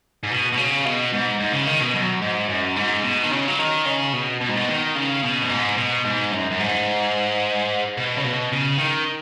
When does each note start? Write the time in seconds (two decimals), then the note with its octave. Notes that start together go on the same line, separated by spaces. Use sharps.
0.23 G#2
0.31 B2
0.52 B2
0.57 C#3
0.85 B2
1.13 G#2
1.40 G#2
1.53 C#3
1.67 D#3
1.81 B2
1.94 F#2
2.22 G#2
2.49 F#2
2.77 G#2
3.04 B2
3.23 D#3
3.31 C#3
3.48 F#3
3.59 D#3
3.86 C#3
4.13 B2
4.40 B2
4.48 G#2
4.56 B2
4.68 D#3
4.96 C#3
5.24 B2
5.43 F#2
5.50 G#2
5.78 B2
6.05 G#2
6.32 F#2
6.51 F#2
6.59 G#2
7.97 B2
8.17 C#3
8.24 B2
8.52 C#3
8.79 D#3